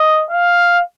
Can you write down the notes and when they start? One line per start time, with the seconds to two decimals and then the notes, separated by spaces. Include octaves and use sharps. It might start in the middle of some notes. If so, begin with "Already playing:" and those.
Already playing: D#5
0.30 F5